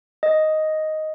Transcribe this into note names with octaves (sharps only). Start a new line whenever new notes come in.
D#5